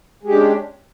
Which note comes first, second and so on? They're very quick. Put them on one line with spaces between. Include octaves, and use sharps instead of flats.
G#3 G4 D4 C#4